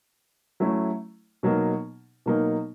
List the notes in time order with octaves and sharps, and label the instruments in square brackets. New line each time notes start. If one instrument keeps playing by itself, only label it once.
[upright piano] F#3 A3 C#4 E4
B2 F#3 A#3 D#4
B2 F#3 A#3 D#4